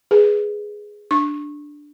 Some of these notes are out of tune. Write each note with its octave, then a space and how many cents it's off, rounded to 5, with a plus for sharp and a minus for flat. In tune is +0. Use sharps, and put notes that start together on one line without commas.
G#4 +0 B4 +0
D4 +0 C#6 -20